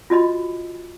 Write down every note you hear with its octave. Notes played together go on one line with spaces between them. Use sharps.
F4 F#4 D#5 B5